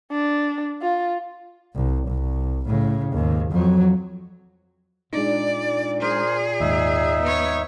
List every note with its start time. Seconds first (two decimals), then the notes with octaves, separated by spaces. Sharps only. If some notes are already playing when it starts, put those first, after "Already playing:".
0.12 D4
0.82 F4
1.75 C2
2.08 C2
2.66 A2 C#3
3.13 D#2 G#2
3.52 F2 F#3
5.13 A#2 G#3 D4 D#4 D5
6.01 G#4 A#4 C5
6.60 D#2 G#2 D#4 E5
7.22 B3 C#5